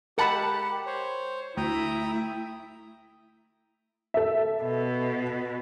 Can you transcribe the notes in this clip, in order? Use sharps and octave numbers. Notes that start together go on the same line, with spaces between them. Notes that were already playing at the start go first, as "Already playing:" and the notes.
G#3 G4 A#4 F#5 A5 B5 F#6
C5 C#5
D2 A3 E4 G5 A#5 D#6
A4 E5
B2